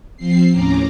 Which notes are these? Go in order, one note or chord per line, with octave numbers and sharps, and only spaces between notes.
F3 C4 C7
D#2 A2 C#4 A#5 D6